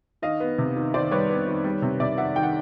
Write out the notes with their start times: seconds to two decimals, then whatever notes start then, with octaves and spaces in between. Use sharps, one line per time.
0.22 D#3 D#5 F5
0.40 B3
0.58 C3
0.76 D#3
0.94 D#3 C5 D5
1.11 G3 B4 C#5
1.29 B3
1.47 D#3
1.64 G3
1.82 C3
2.00 C3 D5 E5
2.18 D#3 E5 F#5
2.36 D#3 G5
2.43 F#5